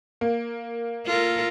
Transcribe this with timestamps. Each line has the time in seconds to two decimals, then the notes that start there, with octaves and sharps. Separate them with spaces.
0.21 A#3
1.06 F4 A4 A#4